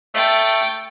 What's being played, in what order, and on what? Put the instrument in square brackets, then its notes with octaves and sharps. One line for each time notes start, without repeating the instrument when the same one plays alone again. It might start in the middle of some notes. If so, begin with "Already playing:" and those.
[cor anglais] A3 [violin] G5 A6